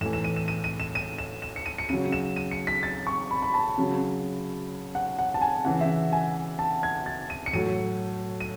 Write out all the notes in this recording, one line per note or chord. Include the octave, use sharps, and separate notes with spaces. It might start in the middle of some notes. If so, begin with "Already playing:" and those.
A2 E3 E7
E7
D#7
E7
D#7
D#7
E7
D#7
E7
E7
C#7
D#7
C#7
C#3 F#3 D#7
E7
D#7
C#7
B6
A6
C#6
B5
B5
A5
C#3 F#3
F#5
F#5
A5
G#5
C#3 E3 F#5
E5
G#5
A5
G#6
A6
D#7
C#7
A2 F#3 D#7
D#7